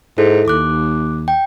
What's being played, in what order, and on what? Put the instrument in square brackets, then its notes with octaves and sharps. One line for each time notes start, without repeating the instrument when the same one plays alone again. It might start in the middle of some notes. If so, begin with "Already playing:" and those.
[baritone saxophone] G#2 [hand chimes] E4 A4
[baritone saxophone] D#2 [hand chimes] D6 F#6
[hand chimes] G5